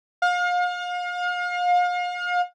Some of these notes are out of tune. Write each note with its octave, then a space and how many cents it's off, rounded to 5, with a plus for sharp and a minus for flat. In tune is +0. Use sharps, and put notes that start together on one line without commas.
F5 +35